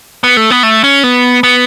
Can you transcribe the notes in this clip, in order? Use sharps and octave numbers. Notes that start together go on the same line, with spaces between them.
B3
A3
B3
A3
C#4
B3
B3